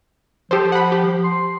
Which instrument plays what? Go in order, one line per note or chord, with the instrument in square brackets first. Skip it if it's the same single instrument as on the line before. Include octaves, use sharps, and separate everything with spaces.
[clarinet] F3 [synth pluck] G4 A4 C5
[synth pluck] F#5 B5
G4
[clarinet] F3
C6